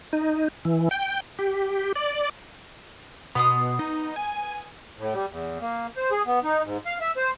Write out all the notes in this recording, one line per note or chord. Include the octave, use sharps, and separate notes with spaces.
D#4
E3
G5
G4
D5
B2 B3 C6 D#6
D#4
G#5
A2
G3
E2
A#3
C5
G#4
B3
D#4
G#2
F5
E5
C5